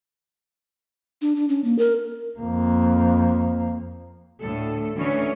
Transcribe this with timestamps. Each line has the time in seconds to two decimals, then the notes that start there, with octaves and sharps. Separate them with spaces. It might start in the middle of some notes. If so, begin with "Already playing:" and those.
1.22 D4
1.36 D4
1.49 C#4
1.64 A#3
1.79 A#4
2.39 F2 A#3
4.40 D2 A2 A4
4.95 D2 E3 C#4 C#5